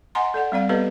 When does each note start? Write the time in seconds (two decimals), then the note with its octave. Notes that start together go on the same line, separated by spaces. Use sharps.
0.15 D#5 F#5 G#5 A#5 C6
0.34 A4 D5 F#5
0.52 G3 C4 D5 F5
0.69 B3 G4 A4 B4 D#5